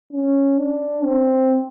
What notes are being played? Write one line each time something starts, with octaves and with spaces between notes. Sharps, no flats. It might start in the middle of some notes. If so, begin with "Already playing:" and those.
C#4
D4
C4